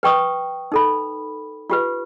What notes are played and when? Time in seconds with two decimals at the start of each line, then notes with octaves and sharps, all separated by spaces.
0.03 B4 G5 C#6 D#6
0.72 D#4 A4 B5
1.70 F4 G4 B4